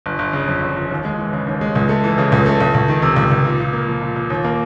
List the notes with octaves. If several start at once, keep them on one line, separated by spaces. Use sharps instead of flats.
G1
G1
C#3
F2
G1
G1
D#2
G#3
E3
C#3
D#2
G#3
C#2
A3
E3
C#3
C#2
A3
C#2
C#2
D#3
C3
C#2
C#2
A#2
A#2
A#3
F3
A#2
A#2
D#2
A#3